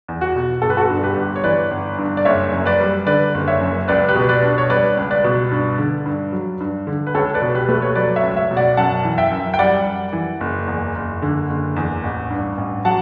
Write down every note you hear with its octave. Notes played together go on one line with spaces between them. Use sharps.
E2
F#4
B2
G1 A4
B4
F#4 A4
G2
G4 B4
G1
C#5
E3 B4 D5
G1
G2
D5
F#1 C#5 E5
F#2
B4 D5
G3
D3 B4 D5
F#1
C#5 E5
F#2
C#2 B4 D5
G4 B4
B2
B4 D5
D4
C#5
G3 B4 D5
C#2
B4 D5
B2
G2
D3
G2
F#3
G2
D3
B4
C#2 A4 C#5
B4 D5
B2
G4 B4
A3 B4
C#5
F#3 B4 D5
C#5 E5
C#2
C#5 E5
B2
D5 F#5
F#2 F#5 A5
E3
E5 G5
F#2
G5
G3 D5 F#5
F#2
E3
F#1
E2
F#1
D3
F#1
E2
A1
G2
A1
F#3 F#5 A5